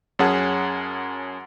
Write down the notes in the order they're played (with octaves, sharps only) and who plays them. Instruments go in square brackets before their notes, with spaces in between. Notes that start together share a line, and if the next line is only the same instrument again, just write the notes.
[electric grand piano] F#2 C#4 G#4 F#5 A5